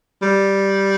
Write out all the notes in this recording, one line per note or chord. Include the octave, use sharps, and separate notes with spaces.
G3